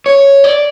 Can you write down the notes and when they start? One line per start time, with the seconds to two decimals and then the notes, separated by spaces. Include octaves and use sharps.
0.06 C#5
0.44 D5